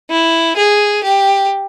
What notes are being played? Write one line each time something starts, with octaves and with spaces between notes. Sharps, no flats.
E4
G#4
G4